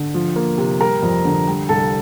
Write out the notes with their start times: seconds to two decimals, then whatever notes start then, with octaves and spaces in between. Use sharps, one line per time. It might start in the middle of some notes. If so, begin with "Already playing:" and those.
Already playing: D3
0.14 F3
0.36 A#3
0.58 C3
0.81 G3 A#4 A#5
1.02 F2
1.25 D3
1.47 G3
1.69 C2 A4 A5